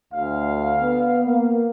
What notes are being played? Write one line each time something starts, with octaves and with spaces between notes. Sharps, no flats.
D2 F5
B3
A#3